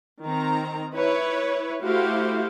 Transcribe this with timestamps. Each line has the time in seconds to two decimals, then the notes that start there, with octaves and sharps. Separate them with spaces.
0.23 D#3 C4 A#5
0.93 E4 B4 C#5
1.82 A3 E4 F#4 G4 C5 F5